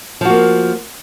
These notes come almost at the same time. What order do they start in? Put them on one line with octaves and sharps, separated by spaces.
F3 F#4 A#3